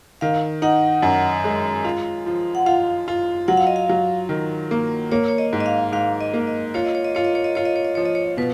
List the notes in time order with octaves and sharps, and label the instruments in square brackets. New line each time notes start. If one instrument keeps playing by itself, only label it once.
[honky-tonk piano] D#3 [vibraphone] F5
[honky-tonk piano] D#4 [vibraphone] F#5
[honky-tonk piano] F#2
G#3
F4
F3
[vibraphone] F#5
[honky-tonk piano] F4 [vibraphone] F5
[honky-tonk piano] F4
[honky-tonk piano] F#3 [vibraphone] F#5
[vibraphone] F5
D#5
F5
[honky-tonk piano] F#3
D#3
A#3
[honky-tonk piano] A#3 [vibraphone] C#5
[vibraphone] C#5
D#5
[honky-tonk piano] G#2
[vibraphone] D#5
F5
[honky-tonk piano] G#2 [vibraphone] F5
[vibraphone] D#5
[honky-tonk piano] A#3
[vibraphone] D#5
[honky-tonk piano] F4 [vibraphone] C#5
[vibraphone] D#5
C#5
D#5
[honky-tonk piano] F4 [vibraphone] C#5
[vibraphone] D#5
C#5
D#5
[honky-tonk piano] F4 [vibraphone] C#5
[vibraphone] D#5
C#5
D#5
[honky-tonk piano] F3 [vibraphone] C#5
[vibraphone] D#5
C#5
[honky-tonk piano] B2 [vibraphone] B4